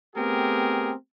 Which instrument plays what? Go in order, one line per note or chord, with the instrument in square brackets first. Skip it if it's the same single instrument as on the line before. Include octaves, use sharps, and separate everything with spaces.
[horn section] A3 B3 C4 G4 G#4 A#4